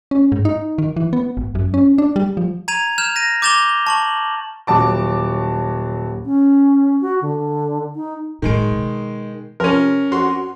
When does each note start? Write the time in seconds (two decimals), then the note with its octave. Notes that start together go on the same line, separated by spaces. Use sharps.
0.11 C#4
0.32 G#2
0.45 D#4
0.78 D#3
0.96 E3
1.13 B3
1.37 G#1
1.55 F#2
1.74 C#4
1.98 D4
2.16 G3
2.37 F3
2.68 A#5 G#6 D#7 F7
2.98 F6 G6 E7 F7
3.16 A#6 D#7
3.42 D6 G6 A6 E7 F7 G7
3.87 A5 C#6 F#7
4.67 D#1 F#3 A5 D6
6.25 C#4
7.01 F#4
7.22 D3
7.96 D#4
8.42 A2 D#3 F#3 G#3 D7
8.71 B2
9.60 C3 F3 C#4 A#4
10.12 F2 F#4 C6